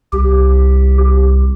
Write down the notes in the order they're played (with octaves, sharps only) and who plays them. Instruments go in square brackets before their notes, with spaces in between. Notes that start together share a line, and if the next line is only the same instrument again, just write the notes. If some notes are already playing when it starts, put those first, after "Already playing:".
[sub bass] C2 [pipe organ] G4